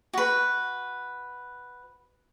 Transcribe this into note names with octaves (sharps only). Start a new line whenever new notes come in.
F#4 B4